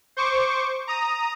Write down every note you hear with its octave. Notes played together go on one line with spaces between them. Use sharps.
C5 C#6 D6
A#5 D#6